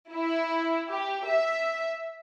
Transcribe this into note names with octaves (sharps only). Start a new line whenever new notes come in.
E4
G4
E5